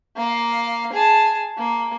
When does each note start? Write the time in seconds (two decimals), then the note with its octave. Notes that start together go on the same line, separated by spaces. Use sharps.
0.17 A#3 F5
0.92 G#4 A5
1.57 A#3